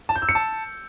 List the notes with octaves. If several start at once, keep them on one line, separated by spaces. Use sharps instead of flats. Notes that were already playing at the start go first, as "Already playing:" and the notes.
A5
G6
E6
C#7
A5